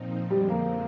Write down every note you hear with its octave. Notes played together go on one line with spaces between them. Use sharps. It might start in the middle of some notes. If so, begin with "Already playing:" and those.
Already playing: A#2 F3 C4 D#4
F2 D3 F3 G3 G#3 C4
A#3